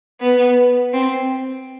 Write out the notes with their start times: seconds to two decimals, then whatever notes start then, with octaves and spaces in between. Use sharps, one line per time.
0.21 B3
0.94 C4